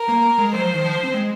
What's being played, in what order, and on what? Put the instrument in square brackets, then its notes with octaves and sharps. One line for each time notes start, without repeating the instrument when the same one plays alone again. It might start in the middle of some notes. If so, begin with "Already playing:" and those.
Already playing: [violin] A#4
[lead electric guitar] A#3
G#3
[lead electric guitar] F#3 [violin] C5
[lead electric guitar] F3
D#3
F3
C4
G#3